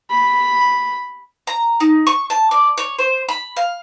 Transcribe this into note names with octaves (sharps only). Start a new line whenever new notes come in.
B5
A#5
D#4
C#6
A5
D5
C#5
C5
B5
F5